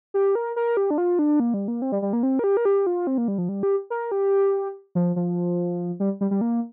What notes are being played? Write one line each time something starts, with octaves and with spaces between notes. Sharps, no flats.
G4
A#4
A#4
G4
D4
F4
D4
A#3
G3
A#3
C4
G3
G3
A#3
C4
A#4
G4
A#4
G4
F4
C4
A#3
G3
F3
G3
G4
A#4
G4
F3
F3
G3
G3
G3
A#3